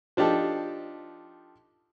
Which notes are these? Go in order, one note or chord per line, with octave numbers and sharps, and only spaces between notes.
F3 D4 D#4 G4 A4